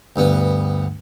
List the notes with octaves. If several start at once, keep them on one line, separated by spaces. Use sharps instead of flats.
D2 G2 B3